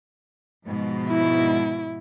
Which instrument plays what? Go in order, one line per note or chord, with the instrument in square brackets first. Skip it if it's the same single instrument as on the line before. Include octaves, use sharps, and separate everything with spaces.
[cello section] G#2 B2 F3
[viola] E4